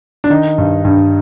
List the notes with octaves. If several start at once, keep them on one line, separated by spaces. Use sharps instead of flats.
D4
D#3 D#4
G2
G2